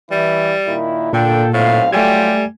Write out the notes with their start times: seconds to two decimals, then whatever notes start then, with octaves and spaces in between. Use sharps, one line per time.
0.11 E3 G3 E4
0.68 A#2 D#3 E4
1.13 A#2 D3 A#3 A4 G5
1.53 B1 A2 C4 F5
1.93 F#3 G3 A3 F4 G4 G#5 G#6